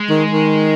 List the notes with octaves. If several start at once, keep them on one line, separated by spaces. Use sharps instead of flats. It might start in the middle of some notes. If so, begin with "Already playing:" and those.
Already playing: G#3
D#3
D#3